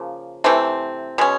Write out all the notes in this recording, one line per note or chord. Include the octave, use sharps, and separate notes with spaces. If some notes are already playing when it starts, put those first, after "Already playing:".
Already playing: C#3 F3 A#3
C3 E3 A3 C4
B2 G#3 C#4